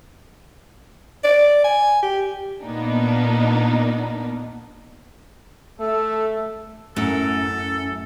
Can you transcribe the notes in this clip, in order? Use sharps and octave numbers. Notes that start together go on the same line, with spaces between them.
D5
G#5
G4
A#2 A#3 B3 D4 D#4
A3 A4
F#2 A2 A4